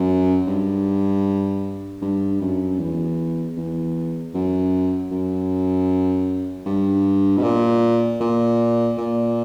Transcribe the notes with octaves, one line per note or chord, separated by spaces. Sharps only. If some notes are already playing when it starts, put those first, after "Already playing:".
Already playing: F#2
G2
G2
F#2
E2
E2
F#2
F#2
G2
B2
A#2
A#2
A#2